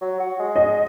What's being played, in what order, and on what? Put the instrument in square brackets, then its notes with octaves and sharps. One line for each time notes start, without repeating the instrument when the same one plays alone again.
[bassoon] F#3
F#4
G#3
[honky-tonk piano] D#5